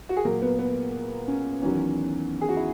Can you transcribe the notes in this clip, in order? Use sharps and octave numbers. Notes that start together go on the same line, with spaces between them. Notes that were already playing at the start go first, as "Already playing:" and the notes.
F#4
G#4
A#2 F#3 A#4
B3
B3
C#4
E2 D#3 F#3 C#4
G#4
F#4
E4